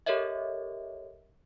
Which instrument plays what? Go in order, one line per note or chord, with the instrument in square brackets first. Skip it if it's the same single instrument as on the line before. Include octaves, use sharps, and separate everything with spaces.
[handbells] G4 A4 A#4 C#5 D#5 E5